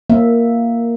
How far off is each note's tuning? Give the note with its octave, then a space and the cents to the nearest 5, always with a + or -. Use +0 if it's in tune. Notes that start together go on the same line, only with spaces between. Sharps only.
A#3 +0 E5 +0